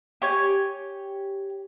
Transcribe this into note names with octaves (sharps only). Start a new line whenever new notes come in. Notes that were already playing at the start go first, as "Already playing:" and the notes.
G4 C#5 G#5